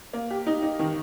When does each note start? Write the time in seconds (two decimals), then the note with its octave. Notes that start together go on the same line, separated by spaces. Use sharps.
0.13 A#3
0.30 G4
0.47 D#4
0.63 D#4
0.79 D#3